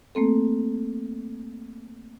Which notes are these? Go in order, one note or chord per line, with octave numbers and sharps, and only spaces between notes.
A3 A#3 C4 A4